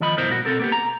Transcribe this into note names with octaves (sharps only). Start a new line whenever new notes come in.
D#2 F3 D#5 B5
C2 G2 B3 E4 A#4 C5
A#2 F#4
B2 C4 A4 A#4
A#3 B3 G4
A#5